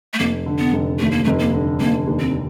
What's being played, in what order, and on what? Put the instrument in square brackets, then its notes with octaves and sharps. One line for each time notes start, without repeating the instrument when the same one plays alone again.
[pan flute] A3
[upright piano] F1 [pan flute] A#3
[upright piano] D3
[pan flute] B3
[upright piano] F1
[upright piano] D#2 [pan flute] A3
[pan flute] A#3
[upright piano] F1 [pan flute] A3
[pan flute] A#3
[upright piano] D3
[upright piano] F1 [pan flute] A#3
[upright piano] D#2
[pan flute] C4